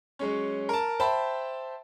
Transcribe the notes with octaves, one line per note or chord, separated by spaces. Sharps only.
F#3 G#3 C#4
A#4 A5
C5 E5 G5 A5 B5